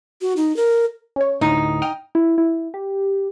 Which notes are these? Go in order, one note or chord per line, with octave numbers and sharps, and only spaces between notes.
F#4
D#4
A#4
C#4 C#5
D2 A2 D#4
G5 D#6 F6
E4
E4
G4